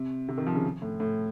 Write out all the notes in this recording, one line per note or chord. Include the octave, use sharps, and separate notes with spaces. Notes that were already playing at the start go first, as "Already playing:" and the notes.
Already playing: C3
C3
D#3
F3
C#3
A2
A2